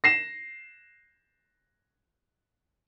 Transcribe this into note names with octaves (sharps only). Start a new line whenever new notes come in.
A#6 C7 E7